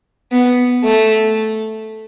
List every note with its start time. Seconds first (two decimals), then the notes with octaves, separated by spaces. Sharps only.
0.32 B3
0.84 A3